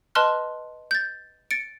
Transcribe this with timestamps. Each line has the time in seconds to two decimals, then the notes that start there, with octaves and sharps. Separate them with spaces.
0.15 B4 D#5 A5 C6 F6 F#6
0.91 G6 A6
1.51 A6 C#7 D7